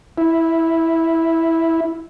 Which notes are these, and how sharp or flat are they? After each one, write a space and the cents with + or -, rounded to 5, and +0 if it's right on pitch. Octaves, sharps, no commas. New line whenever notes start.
E4 -5